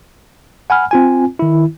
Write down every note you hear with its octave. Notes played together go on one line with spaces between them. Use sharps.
F#5 G#5 B5 F6
C4 F4 G#5
D#3 E4